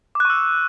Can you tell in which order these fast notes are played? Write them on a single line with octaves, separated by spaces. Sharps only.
D6 F#6 C#6 E6